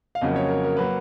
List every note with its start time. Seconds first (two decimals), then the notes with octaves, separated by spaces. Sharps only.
0.15 F5
0.21 F2 C#3 F#3 A#3 D#5
0.36 C#5
0.49 A#4
0.64 A#4
0.77 F#3 A#3 B4